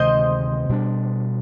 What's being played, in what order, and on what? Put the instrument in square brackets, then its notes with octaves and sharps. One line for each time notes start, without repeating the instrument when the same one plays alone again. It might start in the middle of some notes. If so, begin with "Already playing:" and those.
Already playing: [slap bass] D2 C3 D#3 G#3 [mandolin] C5 D#5
[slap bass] B2 G3 D4